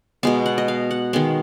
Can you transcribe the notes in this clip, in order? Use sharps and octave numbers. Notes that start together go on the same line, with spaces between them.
B2 G#3 B3 F5
F#5
D#5
F5
F#5
D#3 G#3 B3 F5